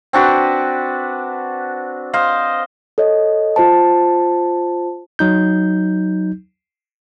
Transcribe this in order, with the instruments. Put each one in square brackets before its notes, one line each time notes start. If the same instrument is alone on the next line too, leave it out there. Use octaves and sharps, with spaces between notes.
[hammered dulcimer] C4 D4 F#4 B4
C5 D#5 F5
[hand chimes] A4 C#5 D#5
F4 C5 A5
[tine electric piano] F#3 D#4 G6